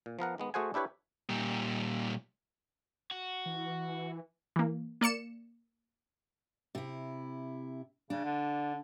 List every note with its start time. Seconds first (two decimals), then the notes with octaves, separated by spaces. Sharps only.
0.06 A#2
0.19 F3 B3 A#4 F#5
0.38 D#3 G#3 B3
0.54 A3 F#4 G#4 C5 F#5 G#5
0.74 D4 E4 G4 B4 C#5
1.29 A#2 G3
3.11 F#4
3.46 E3
4.56 E3 A#3
5.01 A#3 D5 C#7 E7
6.75 C3 E4
8.10 C#3 D4
8.24 D3